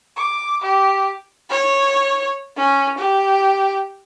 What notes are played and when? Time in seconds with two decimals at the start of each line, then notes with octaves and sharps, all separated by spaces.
0.16 D6
0.62 G4
1.50 C#5
2.57 C#4
2.98 G4